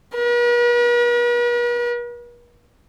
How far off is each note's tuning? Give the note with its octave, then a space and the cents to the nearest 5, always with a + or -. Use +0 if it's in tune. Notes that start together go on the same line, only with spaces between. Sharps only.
B4 -45